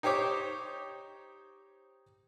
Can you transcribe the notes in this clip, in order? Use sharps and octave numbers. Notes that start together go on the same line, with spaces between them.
D#4 G4 C5 C#5 D6